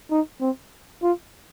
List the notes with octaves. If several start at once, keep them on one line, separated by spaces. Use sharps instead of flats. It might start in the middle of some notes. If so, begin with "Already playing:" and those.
D#4
C4
F4